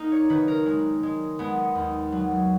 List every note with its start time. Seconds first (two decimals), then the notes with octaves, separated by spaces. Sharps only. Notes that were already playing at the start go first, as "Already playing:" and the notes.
Already playing: A#3 D#4
0.12 C#5
0.30 D#3 B4
0.48 A#4
0.66 G#3
1.03 G#3
1.39 G#3 B3
1.75 D#2
2.12 F#3